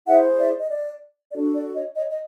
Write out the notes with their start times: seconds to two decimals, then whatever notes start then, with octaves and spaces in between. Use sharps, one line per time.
0.06 E4 G#4 C5 E5 F#5
0.38 D5 E5
0.59 D#5
0.70 D5
1.32 D4 F#4 A4 D5
1.53 D5
1.74 C#5 D#5
1.95 C#5 D#5
2.10 D#5